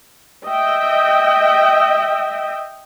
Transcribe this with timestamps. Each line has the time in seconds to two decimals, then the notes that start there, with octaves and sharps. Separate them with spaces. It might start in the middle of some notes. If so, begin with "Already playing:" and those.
0.46 D#5 E5 G5